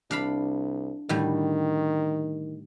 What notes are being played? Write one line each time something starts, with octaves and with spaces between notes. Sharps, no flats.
C2 D4 F5 B5
A2 D3 D#3 G3